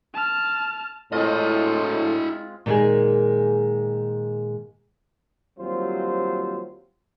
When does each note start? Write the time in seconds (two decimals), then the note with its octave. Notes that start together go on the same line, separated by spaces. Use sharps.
0.14 A5 F6
1.12 A2 G#3 C4 E4 F4 D#5
2.66 A#2 D#3 G3 G#3 A#3 G#4
5.58 D#2 F#3 G3 C4 F4 C5